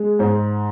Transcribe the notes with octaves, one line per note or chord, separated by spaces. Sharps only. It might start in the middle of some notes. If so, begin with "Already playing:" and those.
Already playing: G#3
G#2 C5